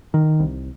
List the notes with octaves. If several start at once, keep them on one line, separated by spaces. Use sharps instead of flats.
D#3
C2